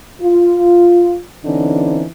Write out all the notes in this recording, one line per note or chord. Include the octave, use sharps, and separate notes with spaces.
F4
D3 E3 C4 C#4 D#4